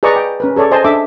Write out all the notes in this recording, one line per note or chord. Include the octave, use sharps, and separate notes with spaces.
G#4 B4 D5 D#5 A#5 C#6
G5
C#4 A#4 B4
G#4 A4 C#5 D5
C5 D#5 G#5 A5 C6
D4 A4 E5 D6